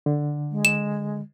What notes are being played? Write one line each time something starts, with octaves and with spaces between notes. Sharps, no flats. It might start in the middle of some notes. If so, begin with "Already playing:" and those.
D3
G#3
E7